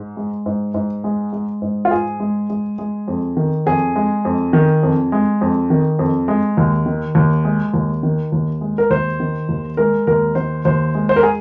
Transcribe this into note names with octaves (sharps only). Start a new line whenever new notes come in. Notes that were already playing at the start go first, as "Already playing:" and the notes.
Already playing: G#2
G#3
G#2
G#2
G#3
G#3
G#2
F4
G#2 G#4
G#3
G#3
G#3
F2
D#3
F2 G#4
G#3
F2
D#3
F2
G#3
F2
D#3
F2
G#3
D#2
D#3
D#2
G#3
D#2
D#3
D#2
G#3
A#4
D#2 C5
D#3
D#2
G#3 A#4
D#2 A#4
D#3 C5
D#2 C5
G#3
C5
A#4
G#4